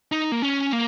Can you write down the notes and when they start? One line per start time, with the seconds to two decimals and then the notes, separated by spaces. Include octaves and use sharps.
0.12 D#4
0.32 A#3
0.42 C#4
0.72 A#3